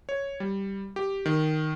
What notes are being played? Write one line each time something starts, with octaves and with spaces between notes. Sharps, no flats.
C#5
G3
G4
D#3